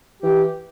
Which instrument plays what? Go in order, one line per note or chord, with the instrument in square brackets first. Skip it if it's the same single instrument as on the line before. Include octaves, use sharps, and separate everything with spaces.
[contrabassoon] E3 [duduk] G4